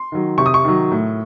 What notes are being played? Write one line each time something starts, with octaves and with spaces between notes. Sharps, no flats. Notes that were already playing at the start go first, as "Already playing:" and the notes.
Already playing: C6
D#3 F#3
C3 C#6
D#6
C#6
D#3 F#3
A2